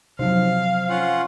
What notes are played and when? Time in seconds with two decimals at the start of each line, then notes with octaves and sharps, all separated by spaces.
0.19 C3 F3 F#3 D#4 C5 F5
0.89 C#4 F4 F#5